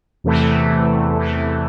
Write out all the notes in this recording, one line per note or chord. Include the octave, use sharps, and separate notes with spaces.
E2 C3 E3 A3
E2 C3 E3 A3